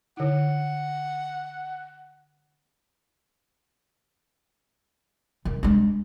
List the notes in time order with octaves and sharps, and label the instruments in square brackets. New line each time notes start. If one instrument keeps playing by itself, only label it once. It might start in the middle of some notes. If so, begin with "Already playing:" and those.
[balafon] D3 E4 [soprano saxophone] F#5
[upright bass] D#3
G#3 D4